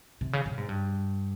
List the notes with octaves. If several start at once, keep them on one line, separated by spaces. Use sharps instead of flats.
C3
C#3
C3
G#2
G2